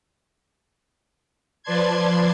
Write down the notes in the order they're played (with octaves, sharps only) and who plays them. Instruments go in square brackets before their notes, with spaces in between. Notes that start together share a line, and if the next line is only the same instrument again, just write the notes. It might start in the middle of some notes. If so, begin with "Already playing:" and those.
[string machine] F3 B4 D5 A5 C6 G#6